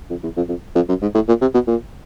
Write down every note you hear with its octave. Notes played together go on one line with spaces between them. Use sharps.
F2
E2
F2
F2
F2
F#2
G#2
A2
A#2
C3
B2
A#2